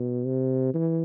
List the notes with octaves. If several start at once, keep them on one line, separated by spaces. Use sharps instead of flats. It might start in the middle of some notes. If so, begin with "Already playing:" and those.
Already playing: B2
C3
E3